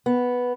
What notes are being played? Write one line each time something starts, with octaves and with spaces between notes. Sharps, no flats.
B3